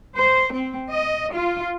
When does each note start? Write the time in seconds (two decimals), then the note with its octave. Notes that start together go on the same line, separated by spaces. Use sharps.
0.16 C5
0.54 C4
0.90 D#5
1.33 F4